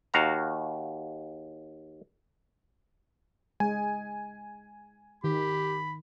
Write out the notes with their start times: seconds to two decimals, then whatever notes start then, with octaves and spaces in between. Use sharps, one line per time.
0.14 D#2 F#4 F5 A#5
3.60 G#3 G#5
5.24 D#3 G4 B5